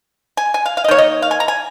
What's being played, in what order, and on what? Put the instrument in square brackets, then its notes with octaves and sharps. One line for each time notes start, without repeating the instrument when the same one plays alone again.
[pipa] G#5
G#5
F5
F5
D#5
D#3 A#3 C#5
D#5
F5
G#5
A#5
G#5